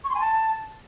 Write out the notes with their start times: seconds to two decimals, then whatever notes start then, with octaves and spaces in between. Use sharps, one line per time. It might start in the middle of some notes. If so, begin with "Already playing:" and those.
0.04 C#6
0.09 C6
0.15 G#5
0.20 A5